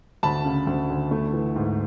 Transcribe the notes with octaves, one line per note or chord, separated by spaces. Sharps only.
D2 A5 B5
C#3
D2
D2
A3
E3
G#2